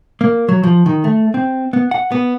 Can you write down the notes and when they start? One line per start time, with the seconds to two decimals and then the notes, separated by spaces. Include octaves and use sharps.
0.21 A#3
0.49 F#3
0.63 F3
0.86 D#3
1.04 A3
1.34 C4
1.73 B3
1.91 F#5
2.12 B3